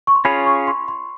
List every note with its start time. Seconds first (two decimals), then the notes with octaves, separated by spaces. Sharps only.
0.07 C#6
0.15 C6
0.25 C#4 F4 G#4 C#5 B5
0.46 C#6
0.67 C6
0.88 C6